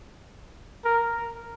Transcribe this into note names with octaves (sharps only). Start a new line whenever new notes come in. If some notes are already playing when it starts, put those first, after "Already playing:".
A#4